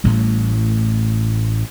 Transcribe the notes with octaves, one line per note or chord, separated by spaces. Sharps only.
A1 A2 G3